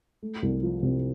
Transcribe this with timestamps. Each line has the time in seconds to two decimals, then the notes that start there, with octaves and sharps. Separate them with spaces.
0.22 A3
0.42 C2
0.63 F3
0.83 C3